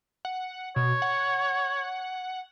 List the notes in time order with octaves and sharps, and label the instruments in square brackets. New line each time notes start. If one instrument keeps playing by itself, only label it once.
[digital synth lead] F#5
[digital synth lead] B2 [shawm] C#5
[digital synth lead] F#5